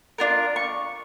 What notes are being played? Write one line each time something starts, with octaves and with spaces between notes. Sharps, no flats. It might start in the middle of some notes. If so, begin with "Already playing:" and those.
D4 F4 A#4
C#6